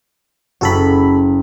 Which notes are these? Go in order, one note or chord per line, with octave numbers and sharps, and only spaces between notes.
F#1 F#4 A4 B5